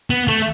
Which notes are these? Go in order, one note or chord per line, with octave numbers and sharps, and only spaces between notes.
B3
A3